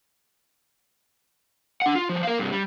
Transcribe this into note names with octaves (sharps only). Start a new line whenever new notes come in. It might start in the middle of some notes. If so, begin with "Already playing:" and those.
D4 F#5
F4
F3 G3
A#4 F5
G2 C3
G3